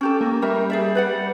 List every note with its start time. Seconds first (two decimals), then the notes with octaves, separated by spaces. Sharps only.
0.01 C#4 G4 A4
0.21 A#3
0.42 G3 A#4 E5
0.70 G#4 D5 E5
0.95 B4 D5 F#5